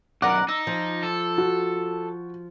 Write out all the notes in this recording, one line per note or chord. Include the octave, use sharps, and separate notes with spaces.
B1 F#2 A#4 D5 F#5 D6
D#4 E6
F3
A4
F#4